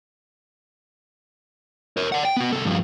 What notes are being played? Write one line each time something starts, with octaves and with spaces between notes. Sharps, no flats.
A#4 C#5
D5 F#5
G5
B3 F#4
C2 A4
G2 F3